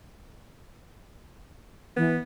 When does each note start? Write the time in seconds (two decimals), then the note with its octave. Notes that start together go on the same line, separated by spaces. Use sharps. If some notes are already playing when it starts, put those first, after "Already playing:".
1.97 E3 B3